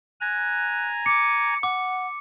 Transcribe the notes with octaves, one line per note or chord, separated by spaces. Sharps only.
G#5 A#5 F#6
D6 C#7
F#5 D6